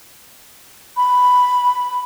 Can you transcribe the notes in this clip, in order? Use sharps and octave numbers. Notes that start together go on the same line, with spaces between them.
B5